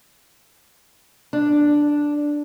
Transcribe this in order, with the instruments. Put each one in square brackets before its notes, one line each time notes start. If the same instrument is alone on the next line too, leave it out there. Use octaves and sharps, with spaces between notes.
[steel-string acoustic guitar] D4